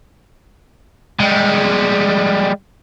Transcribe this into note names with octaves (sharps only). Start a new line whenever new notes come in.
G3 G#3